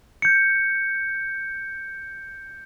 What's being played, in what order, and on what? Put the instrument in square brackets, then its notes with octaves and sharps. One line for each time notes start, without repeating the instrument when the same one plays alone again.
[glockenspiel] G6 C#7